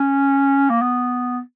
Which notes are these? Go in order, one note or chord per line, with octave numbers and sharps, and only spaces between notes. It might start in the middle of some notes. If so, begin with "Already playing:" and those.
Already playing: C#4
A#3
B3